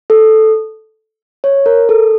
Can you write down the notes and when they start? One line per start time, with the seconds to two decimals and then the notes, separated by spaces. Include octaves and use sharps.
0.10 A4
1.44 C#5
1.66 A#4
1.89 A4